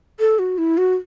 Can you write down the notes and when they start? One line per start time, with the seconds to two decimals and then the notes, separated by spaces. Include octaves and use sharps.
0.20 A4
0.39 F#4
0.58 E4
0.78 F#4